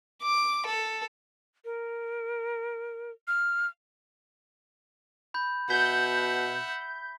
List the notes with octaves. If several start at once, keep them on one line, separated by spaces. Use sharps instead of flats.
D6
A4
A#4
F6
B5 G6
B2 E5 F#5 G6 B6